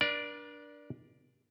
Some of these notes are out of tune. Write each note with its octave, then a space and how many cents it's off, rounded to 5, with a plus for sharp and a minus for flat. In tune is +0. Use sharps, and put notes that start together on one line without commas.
D4 +0 A#4 +45 D5 +0